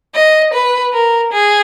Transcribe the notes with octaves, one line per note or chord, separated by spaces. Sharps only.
D#5
B4
A#4
G#4